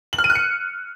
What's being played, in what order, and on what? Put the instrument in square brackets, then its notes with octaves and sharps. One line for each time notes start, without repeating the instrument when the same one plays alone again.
[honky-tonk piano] F#7
F6
D#7
F#6
C#7